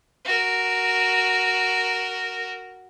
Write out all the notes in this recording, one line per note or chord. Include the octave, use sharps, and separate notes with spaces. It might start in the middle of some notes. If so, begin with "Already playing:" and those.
F#4 A#4